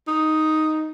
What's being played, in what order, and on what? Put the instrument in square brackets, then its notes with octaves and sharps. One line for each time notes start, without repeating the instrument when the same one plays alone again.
[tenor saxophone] D#4